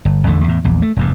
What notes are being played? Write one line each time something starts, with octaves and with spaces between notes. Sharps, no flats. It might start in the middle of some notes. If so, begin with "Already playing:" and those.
G1
A1 E2 D3 A3
E2 A2
A#1 E2
A3
F1 E2 G2